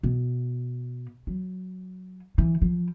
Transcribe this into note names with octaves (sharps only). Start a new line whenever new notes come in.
B2
F#3
E3
F3